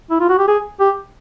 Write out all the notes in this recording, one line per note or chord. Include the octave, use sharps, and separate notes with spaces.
E4
F4
F#4
G4
G#4
G4